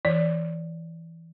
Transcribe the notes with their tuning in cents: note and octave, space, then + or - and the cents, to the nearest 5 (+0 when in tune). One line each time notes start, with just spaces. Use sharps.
E3 +0 D5 -5